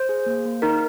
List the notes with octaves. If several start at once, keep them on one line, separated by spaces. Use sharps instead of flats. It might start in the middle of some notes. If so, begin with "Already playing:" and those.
Already playing: C5
G#4
A#3
A#3
D#4 A#4